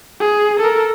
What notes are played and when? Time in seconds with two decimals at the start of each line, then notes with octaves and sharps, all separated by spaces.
0.20 G#4
0.60 A4 A#4